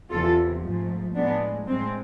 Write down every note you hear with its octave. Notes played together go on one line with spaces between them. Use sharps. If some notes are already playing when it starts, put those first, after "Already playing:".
E2 C3 E3 F4 A4
G#2 F3 A3
A2 G#3 B3 D4
A2 G#3 C4